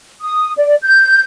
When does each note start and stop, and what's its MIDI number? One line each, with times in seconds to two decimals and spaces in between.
0.21 0.52 87
0.56 0.75 74
0.82 1.23 91